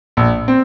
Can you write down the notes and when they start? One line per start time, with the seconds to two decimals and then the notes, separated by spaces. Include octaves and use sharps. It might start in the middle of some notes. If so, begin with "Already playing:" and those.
0.17 A#1
0.48 C4